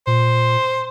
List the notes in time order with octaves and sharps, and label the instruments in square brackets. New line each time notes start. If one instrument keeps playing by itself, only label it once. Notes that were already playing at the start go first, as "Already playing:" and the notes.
[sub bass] A#2 [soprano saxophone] C5